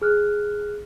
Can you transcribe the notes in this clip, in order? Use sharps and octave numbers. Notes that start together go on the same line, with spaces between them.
G#4 F6 F#6